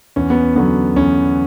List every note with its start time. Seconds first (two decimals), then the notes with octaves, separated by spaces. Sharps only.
0.16 E2 C#4
0.30 B3
0.56 D3 F#3 B3
0.96 E2 C#4